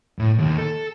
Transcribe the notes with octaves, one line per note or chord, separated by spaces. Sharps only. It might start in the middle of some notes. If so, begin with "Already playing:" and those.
A2
D#2
A4